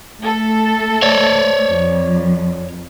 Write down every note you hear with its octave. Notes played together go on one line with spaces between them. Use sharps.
A3 A4
C#5 D5
F2